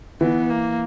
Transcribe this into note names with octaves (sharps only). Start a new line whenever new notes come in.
E3 B3
A#3